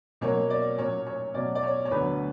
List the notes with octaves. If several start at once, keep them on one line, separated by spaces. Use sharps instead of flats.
B2 F#3 A#3 C#4 C#5
D5
A#2 F#3 C#4 C#5
C#5
B2 F#3 C#4 D5
D5
C#5
C#5
D2 D3 F#3 B3 B4